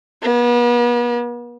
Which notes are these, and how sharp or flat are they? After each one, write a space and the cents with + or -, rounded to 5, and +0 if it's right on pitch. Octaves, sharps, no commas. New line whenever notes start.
B3 -40